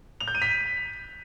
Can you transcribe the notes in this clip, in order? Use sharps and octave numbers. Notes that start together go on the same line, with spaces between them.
F7
G6
D#7
B6